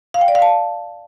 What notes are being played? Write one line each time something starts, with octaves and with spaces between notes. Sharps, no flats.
F5
G5
D5
F5
A5